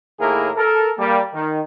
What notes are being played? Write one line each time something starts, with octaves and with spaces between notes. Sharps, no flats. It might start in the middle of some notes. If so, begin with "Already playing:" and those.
D#2 A2 A#3 E4 G#4 A#4
A4 A#4
G3 A#3
D#3